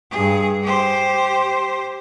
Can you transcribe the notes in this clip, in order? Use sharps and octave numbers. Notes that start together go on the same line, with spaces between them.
G2 G#4
G4 C5